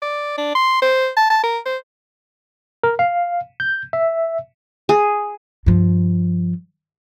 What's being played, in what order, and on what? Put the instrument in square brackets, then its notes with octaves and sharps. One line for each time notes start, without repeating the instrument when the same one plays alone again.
[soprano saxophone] D5
D4
C6
C5
A5
A5
A#4
C5
[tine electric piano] A#4
F5
G6
E5
[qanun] G#4
[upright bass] G2 F3